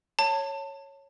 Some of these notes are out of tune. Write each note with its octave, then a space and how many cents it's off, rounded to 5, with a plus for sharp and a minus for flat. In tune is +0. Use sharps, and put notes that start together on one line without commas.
C#5 -5 A5 +25